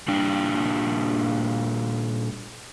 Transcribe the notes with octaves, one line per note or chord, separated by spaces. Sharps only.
A#2 G3 D4 G5